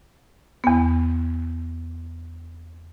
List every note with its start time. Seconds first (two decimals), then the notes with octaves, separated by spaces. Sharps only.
0.64 E2 B3